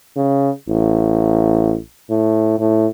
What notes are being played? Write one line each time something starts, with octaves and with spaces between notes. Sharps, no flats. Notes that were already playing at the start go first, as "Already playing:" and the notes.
C#3
A1
A2
A2